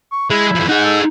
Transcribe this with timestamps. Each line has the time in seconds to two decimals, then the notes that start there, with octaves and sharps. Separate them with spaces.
0.12 C#6
0.30 G#3 E4
0.55 E2 F3
0.69 D#4 G#4 F#5
0.85 A4